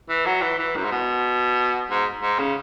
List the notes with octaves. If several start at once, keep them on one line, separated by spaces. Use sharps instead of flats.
E3
F#3
E3
E3
F#2
G#2
B2
G#2
G#2
C#3